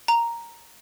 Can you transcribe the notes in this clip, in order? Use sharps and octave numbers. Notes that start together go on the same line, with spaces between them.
A#5